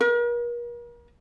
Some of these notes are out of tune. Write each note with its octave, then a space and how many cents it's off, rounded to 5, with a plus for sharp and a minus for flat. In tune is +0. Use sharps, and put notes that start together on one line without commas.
A#4 +40